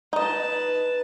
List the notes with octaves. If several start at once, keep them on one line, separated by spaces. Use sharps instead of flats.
D#4 B4 D#5 A5